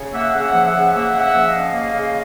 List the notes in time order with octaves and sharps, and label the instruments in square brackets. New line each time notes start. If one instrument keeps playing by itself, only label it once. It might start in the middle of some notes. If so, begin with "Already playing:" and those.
Already playing: [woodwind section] C#3
A#3 E5 F#5
C#3
E5 F#5
F3
E5 F#5
C#3
A#3 E5 F#5
C#3
E5 F#5
F3
D#5 F5
C#3
A#3
C#3